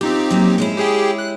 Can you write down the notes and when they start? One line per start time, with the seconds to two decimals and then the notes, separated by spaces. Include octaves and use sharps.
0.01 C4 D#4 F4 G4
0.31 F#3 A#3
0.58 G#3 C#4 E4
0.77 G4 G#4 G5
1.18 F#6